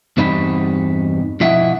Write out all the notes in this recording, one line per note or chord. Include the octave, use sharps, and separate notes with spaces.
E2 G2 G3 C4 D#4 B5
B1 F3 E4 D#5 E5 F#5